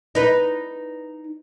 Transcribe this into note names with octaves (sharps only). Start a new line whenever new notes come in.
D#4 B4